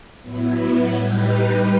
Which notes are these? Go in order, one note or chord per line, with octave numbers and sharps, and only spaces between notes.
A2 F#3 B3 E4
A2 G3 D#4 G4 B4